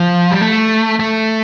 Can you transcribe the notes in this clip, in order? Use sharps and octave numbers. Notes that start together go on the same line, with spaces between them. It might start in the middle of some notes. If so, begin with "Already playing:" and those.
Already playing: F3
G3
A3
A3